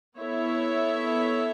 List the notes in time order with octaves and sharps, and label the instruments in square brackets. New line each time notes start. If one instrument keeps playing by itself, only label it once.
[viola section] B3 E4 A4 C#5 E5